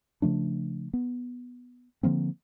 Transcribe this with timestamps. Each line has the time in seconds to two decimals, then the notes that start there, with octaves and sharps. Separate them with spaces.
0.22 C#3 F3 A3 D4
0.93 B3
2.03 D3 F3 A#3 C4